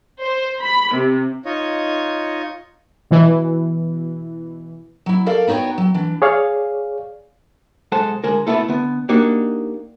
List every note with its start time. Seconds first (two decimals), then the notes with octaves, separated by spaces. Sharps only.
0.22 C5
0.62 B5
0.93 C3
1.45 D#4 F4 C#5 D#5
3.11 B2 E3
5.06 F#3 E4
5.26 A4 A#4 D5 F5
5.47 B3 D#4 F#4 C#5 G5
5.78 F#3
5.94 E3 D4
6.22 G#4 C#5 D5 F5
7.92 B1 G#3 A4 C5 F#5 A5
8.24 D3 G#3 A#4
8.47 A3 B3 C4 E4 A4
8.68 D3 B3
9.09 A#3 D4 D#4 F#4 G4